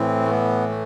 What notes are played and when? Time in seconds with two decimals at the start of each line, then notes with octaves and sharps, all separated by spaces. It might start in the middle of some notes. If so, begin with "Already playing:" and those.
Already playing: A2 E3 C4
0.26 A3
0.30 B3
0.69 A3